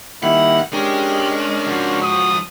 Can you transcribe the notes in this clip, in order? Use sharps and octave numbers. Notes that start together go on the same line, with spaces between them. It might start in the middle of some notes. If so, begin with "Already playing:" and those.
D#3 G3 A#3 E4 F#5
G#3 C#4 D4 G4 A#4
C#2 F3 F#4
D#6